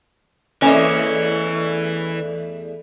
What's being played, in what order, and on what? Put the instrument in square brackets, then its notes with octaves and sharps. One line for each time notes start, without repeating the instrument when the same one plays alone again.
[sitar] E2 A3 D#5 [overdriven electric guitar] E3 [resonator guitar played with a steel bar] C#4 [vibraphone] A4 D5